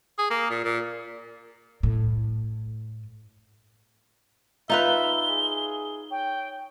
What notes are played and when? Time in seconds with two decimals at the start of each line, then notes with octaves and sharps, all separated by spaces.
0.18 G#4
0.31 A#3
0.50 A#2
0.65 A#2
1.83 A2
4.70 D#4 F4 B4 E5 G7
5.29 G#4
6.11 C#5 G5